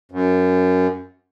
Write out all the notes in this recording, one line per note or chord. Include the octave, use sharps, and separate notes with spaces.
F#2